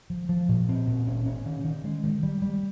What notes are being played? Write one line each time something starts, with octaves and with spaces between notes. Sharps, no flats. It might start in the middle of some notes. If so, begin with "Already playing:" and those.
F3
F3
A#2
C4
A#2
C#4
C#4
D#3
D#3
G#3
D#3
G3
G3